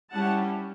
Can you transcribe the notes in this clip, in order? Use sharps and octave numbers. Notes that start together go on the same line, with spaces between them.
G3 C#4 E4 F#5 A5